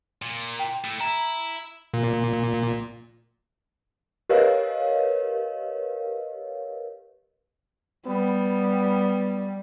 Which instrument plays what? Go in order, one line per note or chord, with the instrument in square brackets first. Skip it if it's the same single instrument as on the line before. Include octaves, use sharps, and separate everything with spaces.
[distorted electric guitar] A#2
[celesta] G5
[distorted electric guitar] A3 E4
[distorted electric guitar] E4 [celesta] A#5
[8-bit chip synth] A#2
[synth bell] G4 A#4 B4 C#5 D#5 F5
[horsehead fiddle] G3 [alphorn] B3